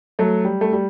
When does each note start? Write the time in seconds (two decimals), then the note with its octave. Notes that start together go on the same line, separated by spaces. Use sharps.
0.19 F#3 A3
0.45 G3
0.61 A3
0.73 G3